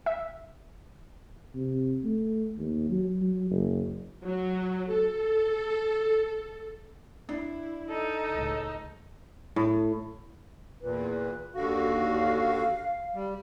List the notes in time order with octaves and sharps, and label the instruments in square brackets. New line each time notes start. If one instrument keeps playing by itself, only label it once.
[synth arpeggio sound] E5
[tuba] C3
A3
D#2
F#3
F#3
F#1
[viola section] F#3
A4
[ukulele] D4 [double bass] E4
[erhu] D#4 [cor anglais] A4
[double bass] C#2 A2
[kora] A2
[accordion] E2 A#2 [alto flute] B4
[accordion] D#2 D3 F#4 [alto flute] F5
[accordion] G3